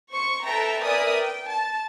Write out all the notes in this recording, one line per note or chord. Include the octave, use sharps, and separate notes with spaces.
C5 C#6
A4 B4 E5 G5 A5 A#5
A#4 B4 D5 E5 G#5 D#6
G5
A5